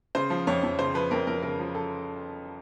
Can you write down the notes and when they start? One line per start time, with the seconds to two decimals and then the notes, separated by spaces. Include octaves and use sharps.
0.15 C#3 C5
0.30 F3
0.47 F2 C#5
0.63 F2
0.79 C#3 C5
0.95 F3 B4
1.11 F2 A#4
1.27 F2 A#4
1.42 C#3 A#4
1.59 F3
1.75 A4